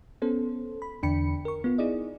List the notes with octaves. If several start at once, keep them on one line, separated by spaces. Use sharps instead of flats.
B3 C#4 A4 C5
B5
E2 D3 D4 G5 B5 C#7
A#4 C#6
B3 F4
D#4 E4 G#4 D5 D#5